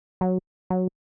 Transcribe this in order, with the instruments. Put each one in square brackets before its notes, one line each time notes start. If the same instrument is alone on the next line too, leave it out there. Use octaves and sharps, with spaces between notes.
[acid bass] F#3
F#3